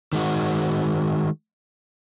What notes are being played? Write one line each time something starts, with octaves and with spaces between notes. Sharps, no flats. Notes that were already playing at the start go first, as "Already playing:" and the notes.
D#3 G#3 F#4